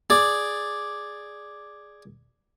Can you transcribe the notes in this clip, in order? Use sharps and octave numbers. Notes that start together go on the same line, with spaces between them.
G#4 D5